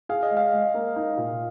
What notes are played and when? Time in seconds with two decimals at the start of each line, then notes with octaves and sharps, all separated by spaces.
0.09 G#4 F5
0.23 D#5
0.31 G#3
0.37 F5
0.53 G#3
0.74 A#3
0.96 D#4
1.17 A#2